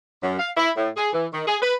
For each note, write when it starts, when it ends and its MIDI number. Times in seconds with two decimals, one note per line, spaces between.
0.22 0.37 42
0.38 0.49 77
0.56 0.69 64
0.76 0.89 45
0.97 1.09 68
1.12 1.26 52
1.33 1.42 51
1.46 1.55 68
1.61 1.73 71